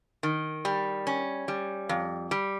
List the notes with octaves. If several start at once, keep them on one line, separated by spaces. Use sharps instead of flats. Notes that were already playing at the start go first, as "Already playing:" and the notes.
D#3
G3
C#4
G3
F2
G3